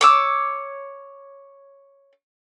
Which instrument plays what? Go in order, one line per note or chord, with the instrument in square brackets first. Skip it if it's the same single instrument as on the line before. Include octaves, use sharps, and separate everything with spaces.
[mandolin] C#5 D6 E6